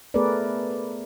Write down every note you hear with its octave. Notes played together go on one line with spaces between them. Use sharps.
A3 B3 G#4 A#4 B4 D5